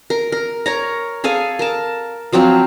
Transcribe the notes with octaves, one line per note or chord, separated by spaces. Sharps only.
A#4
A#4
A#4 C#5 A#5
G#4 A4 F5 G#5
A#4 A5
F3 F#3 C4 F4